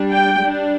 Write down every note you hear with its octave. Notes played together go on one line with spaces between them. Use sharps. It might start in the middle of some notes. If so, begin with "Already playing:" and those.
Already playing: G3 D4
G5
G3 D4